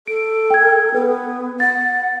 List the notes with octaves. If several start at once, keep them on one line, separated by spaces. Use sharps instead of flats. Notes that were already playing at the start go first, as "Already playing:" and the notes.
A4 D7
G5 G#6
B3 B4
F#5 A6